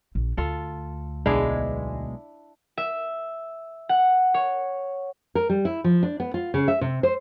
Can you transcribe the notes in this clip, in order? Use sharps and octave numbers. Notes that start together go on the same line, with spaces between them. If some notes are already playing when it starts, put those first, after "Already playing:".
A#1
D2 F4 A4
B1 G#3 D4 E4 F5
E5
F#5
C#5
A#4
G3
E4
F3
D4
B3
F4
C#3
E5
C3
C5